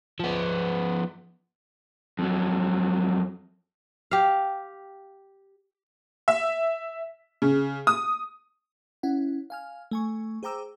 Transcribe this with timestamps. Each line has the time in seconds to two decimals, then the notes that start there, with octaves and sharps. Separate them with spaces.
0.20 F3 B3
2.19 F2 F#3
4.11 G4 F5
6.28 E5
7.42 C#3
7.87 D#6
9.03 C#4 E4 F#5
9.50 F5 G#5 F6
9.91 A3 G#5 C#6
10.43 G#4 C5 G5 A#5 D6 E6